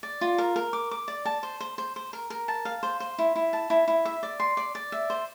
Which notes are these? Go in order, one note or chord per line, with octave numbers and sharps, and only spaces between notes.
D5
F4
A#4
A#4
D6
D6
D5
A5
C5
C5
C5
C5
A#4
A#4
A5
F5
C5
C5
E4
E4
A5
E4
E4
E5
D5
C6
D5
D5
E5
C5